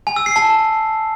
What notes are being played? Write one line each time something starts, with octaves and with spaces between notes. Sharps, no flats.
G#5
E6
C7
A5